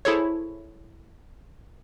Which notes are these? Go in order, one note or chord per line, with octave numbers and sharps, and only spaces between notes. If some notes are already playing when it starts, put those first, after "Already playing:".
E4 G#4 A4 C5 C#5